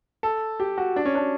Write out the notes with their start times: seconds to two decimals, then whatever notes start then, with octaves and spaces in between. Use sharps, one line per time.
0.23 A4
0.60 G4
0.78 F#4
0.96 D4
1.05 C#4
1.15 D4